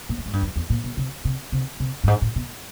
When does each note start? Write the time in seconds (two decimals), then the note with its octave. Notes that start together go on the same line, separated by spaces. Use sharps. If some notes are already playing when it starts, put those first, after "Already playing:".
0.09 A#2
0.18 A2
0.26 G#2
0.33 G2
0.42 F#2
0.56 E2
0.70 A#2
0.84 B2
0.97 C3
1.25 C3
1.52 C3
1.80 C3
2.04 G2
2.08 G#2
2.22 A2
2.36 B2